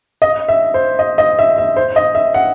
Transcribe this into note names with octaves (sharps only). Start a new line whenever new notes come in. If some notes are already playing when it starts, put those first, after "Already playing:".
D#5
E5
C5
D#5
D#5
E5
E5
C5
D#5
E5
F#5